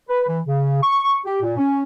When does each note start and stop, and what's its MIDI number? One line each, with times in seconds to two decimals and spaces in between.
0.08 0.24 71
0.27 0.39 52
0.46 0.81 49
0.82 1.18 85
1.25 1.39 67
1.42 1.55 46
1.57 1.81 61